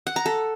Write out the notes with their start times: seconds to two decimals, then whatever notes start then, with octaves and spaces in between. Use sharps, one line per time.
0.07 F#5
0.16 A#5
0.26 A4